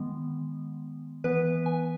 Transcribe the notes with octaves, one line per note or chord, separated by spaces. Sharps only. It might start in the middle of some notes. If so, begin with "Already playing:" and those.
Already playing: D#3 G#3 B3
E3 B3 B4
G#5